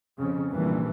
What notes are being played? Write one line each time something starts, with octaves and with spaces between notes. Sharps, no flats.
F2 C#3
F1 A#1 G2 A#2 E3